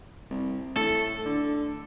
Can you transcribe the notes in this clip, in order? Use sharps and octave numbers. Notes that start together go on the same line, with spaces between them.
C2
A2 A4
D3